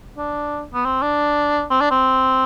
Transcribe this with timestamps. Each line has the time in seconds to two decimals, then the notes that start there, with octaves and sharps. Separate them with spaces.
0.17 D4
0.74 B3
0.85 C4
1.02 D4
1.71 C4
1.81 D4
1.91 C4